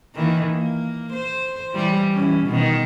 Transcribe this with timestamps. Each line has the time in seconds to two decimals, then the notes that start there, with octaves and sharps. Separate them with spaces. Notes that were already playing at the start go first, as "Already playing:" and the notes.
0.15 D#3 E3 A#3
0.51 A#3
1.13 C5
1.71 E3 G3
2.13 E3 C#4
2.45 B2 D#3